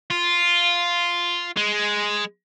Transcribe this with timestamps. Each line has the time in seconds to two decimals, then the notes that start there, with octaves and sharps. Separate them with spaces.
0.10 F4
1.57 G#3